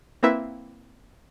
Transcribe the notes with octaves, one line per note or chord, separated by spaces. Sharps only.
A#3 C4 E4 B4 E5